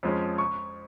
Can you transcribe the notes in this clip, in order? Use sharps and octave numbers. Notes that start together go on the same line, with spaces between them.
F2 F3 G#3 C#4
C#6